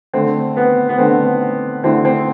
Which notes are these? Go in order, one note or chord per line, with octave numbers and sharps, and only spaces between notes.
D3 A3 C4
B3
B3
D3 A3 C4
D3 A3 C4 E4
C4